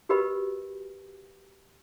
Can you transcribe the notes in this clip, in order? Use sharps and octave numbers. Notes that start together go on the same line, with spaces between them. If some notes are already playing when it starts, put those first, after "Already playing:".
F#4 G4 A#4 B4 D#5 B5